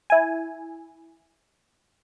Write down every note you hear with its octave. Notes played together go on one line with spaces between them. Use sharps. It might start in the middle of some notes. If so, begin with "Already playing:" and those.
E4 G#5